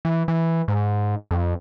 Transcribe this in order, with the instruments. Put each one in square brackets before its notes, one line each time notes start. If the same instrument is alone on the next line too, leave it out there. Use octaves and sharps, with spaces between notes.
[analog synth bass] E3
E3
G#2
F2